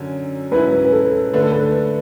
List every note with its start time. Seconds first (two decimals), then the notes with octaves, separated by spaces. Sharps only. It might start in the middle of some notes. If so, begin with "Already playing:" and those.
Already playing: F#2 D3 F#3 C#4
0.51 G#2 F#3 C#4 E4 B4
0.85 B4
0.92 A4
1.33 D3 A3 D4 B4
1.43 A4
1.52 B4